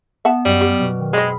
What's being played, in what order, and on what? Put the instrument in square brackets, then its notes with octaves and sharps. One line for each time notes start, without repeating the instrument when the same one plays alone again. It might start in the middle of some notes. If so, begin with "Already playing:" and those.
[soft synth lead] B3 [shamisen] E5 F#5 A5 [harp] E7
[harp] F#2 D#5 [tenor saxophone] G3
[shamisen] G4 [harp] D5 F6
[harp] B2
[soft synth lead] D#3
[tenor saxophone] G#3 [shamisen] C4 D#5 [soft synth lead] G#4 [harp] B5